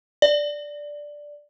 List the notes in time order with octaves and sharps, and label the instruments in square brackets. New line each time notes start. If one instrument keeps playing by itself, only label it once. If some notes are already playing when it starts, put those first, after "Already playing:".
[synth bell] D5